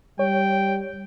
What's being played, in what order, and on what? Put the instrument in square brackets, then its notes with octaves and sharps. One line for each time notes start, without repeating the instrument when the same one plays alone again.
[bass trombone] G3 [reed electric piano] C#5 [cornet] G5